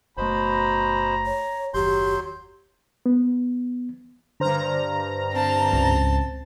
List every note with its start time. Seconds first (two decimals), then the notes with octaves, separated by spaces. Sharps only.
0.17 F#1 B2 A3 C5 A#5 B5
1.26 C#5
1.74 F#1 D#2 F#3 G4 C6 G6
3.06 B3
4.40 G2 D3 C5 A#5 F6
5.32 C4 A5
5.72 C#2 G#2